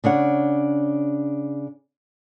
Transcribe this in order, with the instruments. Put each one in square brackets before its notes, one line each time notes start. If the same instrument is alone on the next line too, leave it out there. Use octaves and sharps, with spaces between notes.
[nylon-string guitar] C#3 D4 C#5 F#5